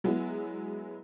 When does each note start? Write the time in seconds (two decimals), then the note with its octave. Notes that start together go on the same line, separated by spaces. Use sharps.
0.04 F#3 G#3 B3 E4